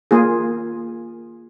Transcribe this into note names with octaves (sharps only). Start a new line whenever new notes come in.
A#3 F4 G#4